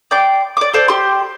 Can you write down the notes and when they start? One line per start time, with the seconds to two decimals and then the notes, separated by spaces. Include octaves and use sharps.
0.11 D5 G5 C6 D6
0.57 D5 D6
0.73 A4 C5 D5
0.88 G4 C6